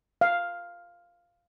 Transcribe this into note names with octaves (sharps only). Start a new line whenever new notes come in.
F5